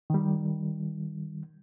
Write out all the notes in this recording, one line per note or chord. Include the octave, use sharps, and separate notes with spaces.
D#3 G3